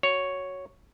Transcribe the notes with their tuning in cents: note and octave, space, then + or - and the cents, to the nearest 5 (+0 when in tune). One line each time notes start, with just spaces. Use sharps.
F#4 +0 C#5 +0